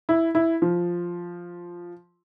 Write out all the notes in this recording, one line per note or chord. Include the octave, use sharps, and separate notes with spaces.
E4
E4
F3